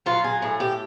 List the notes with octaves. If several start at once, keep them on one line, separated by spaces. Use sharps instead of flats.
F#3 F4
G#4
A2 G#4
G4